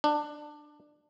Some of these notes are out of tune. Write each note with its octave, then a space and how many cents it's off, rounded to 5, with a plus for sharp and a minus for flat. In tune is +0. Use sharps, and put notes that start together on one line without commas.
D4 +15